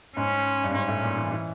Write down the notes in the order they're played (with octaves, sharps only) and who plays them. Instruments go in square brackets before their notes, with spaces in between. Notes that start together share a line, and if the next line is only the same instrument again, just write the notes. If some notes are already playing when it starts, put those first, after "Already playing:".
[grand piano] G#2 [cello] C#4
[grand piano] G2
[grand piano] G#2 [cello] C#4
[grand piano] A2
A#2
E3
E3